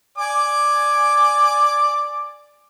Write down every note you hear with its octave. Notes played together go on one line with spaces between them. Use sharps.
D5 G#5 D6